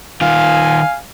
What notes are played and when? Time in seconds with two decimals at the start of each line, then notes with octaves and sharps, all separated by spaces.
0.21 D#3 F4 F5 G#5